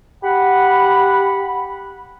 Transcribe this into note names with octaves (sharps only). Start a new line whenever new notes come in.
G4 F#5 B5